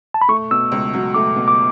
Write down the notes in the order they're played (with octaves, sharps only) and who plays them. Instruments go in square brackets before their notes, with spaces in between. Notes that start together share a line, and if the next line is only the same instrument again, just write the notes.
[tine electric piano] A5
B5
[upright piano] A3 [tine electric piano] C#6
[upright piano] B2 [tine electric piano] E6
[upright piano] C#2
F#3
[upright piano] A3 [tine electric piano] D6
[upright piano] B2
[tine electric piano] D6